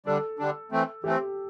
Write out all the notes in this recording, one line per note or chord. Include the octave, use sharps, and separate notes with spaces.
D3 G3 D4 A4
D3 G3 D4
E3 A3 C4
E3 A3 C4 G4